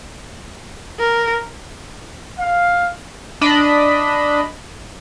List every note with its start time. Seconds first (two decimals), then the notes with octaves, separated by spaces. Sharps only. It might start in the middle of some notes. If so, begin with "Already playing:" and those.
0.99 A#4
2.38 F5
3.41 D4 D#5 B5